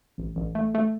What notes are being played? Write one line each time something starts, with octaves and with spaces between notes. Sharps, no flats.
A1
A1
A3
A3